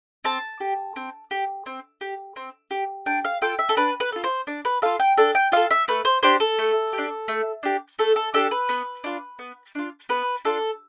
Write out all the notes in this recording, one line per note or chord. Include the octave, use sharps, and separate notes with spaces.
C4 A5
G4
C4
G4
C4
G4
C4
G4
D4 G5
F5
F4 A4 G5
E5
A4
D4 B4
B4
F4 A4
C5
D4
B4
F4 A4 F5
G5
D4 A4
G5
F4 A4 F5
E5
A3 B4
C5
D4 G4 C5
A4
A3
G4
D4
A3
D4 G4
A3 A4
A4
D4 G4 A4
B4
B3
D4 F4
B3
D4 F4
B3 B4
D4 F4 A4